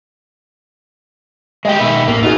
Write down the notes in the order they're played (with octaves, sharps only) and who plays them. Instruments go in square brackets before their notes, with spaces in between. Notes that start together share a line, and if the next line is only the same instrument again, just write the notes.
[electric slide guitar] G#3 G4 [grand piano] D#5 G5
[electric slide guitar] B2 D#3 B4 [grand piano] E5
[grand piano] A1 [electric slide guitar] A#3
[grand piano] D#4 F#4 G#4 [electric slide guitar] F4